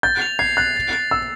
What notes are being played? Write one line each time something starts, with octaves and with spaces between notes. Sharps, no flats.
G6 A6
F7
G#6 C7
F#6 A6
A6
A6
E6 C7